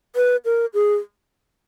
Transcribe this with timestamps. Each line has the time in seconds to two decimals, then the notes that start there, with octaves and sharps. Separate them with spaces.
0.16 B4
0.45 A#4
0.74 G#4